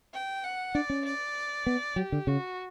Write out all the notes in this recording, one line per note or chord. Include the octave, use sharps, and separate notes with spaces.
G5
F#5
D4 D5
C#4
D5
B3
F#3 G4
D3
C#3 F#4